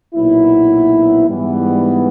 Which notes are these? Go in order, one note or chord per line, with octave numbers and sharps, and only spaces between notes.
B1 A#2 F#3 B3 E4
G#2 E3 G3 B3